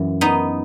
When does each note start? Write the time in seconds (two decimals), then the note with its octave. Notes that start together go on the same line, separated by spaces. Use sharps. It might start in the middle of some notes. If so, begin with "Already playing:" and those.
Already playing: F#2 E3
0.21 B3 D#4